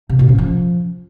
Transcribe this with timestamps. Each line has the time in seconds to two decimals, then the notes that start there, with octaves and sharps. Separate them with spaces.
0.09 C3
0.19 A#2
0.29 C#4
0.38 F3